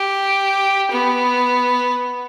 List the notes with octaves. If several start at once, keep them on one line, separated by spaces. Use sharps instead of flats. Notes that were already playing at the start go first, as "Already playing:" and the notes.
Already playing: G4
B3